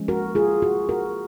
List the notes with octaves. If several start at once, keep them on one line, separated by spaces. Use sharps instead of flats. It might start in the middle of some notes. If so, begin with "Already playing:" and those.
Already playing: F3 G#3 C#4
F#4 A#4
F4 G#4
F#4
F#4 A#4